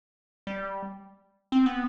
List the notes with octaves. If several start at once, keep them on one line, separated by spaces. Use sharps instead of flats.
G3
C4
B3